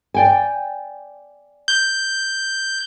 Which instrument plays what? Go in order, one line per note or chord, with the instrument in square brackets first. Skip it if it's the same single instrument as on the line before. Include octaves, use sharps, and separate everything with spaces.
[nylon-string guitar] D5 G5 G#5
[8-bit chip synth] G6